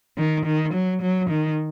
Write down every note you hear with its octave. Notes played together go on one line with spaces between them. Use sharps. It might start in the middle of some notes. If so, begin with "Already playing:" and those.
D#3
D#3
F#3
F#3
D#3